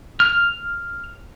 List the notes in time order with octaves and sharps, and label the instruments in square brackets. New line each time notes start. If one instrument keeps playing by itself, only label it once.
[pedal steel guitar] F6